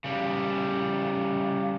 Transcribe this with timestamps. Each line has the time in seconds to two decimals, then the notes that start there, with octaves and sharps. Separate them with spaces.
0.04 C#3 G3